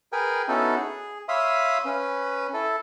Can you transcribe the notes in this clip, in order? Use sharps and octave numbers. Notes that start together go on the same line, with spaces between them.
G#4 A#4 B4 G5 G#5
B3 C#4 D#4 E4 F#4 A4
G#4
C#5 E5 F5 B5 C6 D#6
C#4 B4
E4 A4